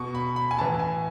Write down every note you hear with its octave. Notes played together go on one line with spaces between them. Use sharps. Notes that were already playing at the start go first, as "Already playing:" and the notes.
Already playing: B2 C#6
B5
B5
G#5
A2 E3 A5
G#5